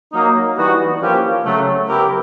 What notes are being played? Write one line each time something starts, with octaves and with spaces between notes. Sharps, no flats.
F#3 A#3 D#4
E3 G3 B3 D#4 F#4
F3 A#3 C#4 E4 G4
C#3 F#3 A3
B3 E4 G4 A#4